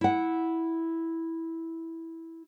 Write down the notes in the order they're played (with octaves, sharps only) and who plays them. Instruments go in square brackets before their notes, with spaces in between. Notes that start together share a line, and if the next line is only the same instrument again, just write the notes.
[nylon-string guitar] E4 F#5